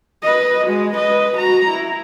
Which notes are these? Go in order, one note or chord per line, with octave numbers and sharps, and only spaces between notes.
B4 D#5
G#3 F#4
B4 D#5
F#4 A#5
E4